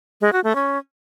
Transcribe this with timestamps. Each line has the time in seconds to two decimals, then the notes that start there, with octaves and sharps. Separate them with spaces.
0.21 G#3
0.33 F#4
0.44 A3
0.55 C#4